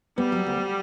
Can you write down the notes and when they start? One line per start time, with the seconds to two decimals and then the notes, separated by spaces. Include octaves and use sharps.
0.17 G3 B3
0.32 F#3
0.46 D2